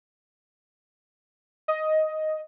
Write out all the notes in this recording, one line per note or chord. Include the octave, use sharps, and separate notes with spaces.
D#5